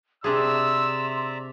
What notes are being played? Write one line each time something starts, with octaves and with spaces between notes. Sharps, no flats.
C3 D4 G#4 D5 E5 A#5 C6 E6